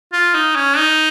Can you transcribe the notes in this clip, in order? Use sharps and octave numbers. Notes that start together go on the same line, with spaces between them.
F4
D#4
C#4
D#4